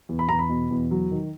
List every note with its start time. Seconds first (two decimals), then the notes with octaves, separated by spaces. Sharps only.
0.09 E2
0.19 B5
0.29 E2 A#5
0.39 B5
0.49 B2
0.71 E2
0.91 F#3
1.11 D#3